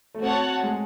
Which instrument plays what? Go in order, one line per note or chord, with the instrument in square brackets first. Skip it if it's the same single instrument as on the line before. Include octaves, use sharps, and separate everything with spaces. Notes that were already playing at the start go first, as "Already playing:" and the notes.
[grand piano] A3
[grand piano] C4 [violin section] F#4 C#5 F#5 A5
[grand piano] G#3